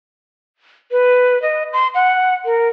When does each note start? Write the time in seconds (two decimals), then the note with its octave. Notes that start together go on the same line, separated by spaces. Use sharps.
0.91 B4
1.42 D#5
1.73 C6
1.95 F#5
2.45 A#4